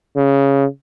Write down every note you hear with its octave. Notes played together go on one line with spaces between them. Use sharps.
C#3